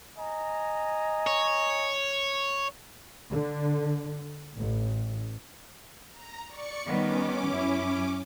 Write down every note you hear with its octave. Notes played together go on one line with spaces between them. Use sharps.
D#5 G#5 A#5
C#5
D3
A1
A#5
D5 C#6 C#7
D#3 G3 B3 C#4 D6
F#2 E4